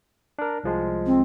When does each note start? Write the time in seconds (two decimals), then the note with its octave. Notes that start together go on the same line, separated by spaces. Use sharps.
0.39 D4 A#4
0.64 C2 F3 G#3
1.06 C4